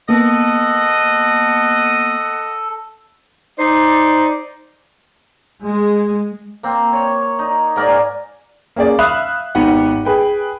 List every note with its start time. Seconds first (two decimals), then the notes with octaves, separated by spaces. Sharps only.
0.09 A#3 B3 A4 D#5 F#5
3.59 D#4 C5 D5
5.64 G#3
6.63 A#3 C4
6.93 C#5
7.39 D#4
7.76 G#2 A#4 D5 G#5
8.76 A#3 C#4 G#4 D5
8.99 E5 F5 B5 D#6 F#6
9.55 G#1 B3 D#4 G4 F#5
10.05 G#4 B4 G5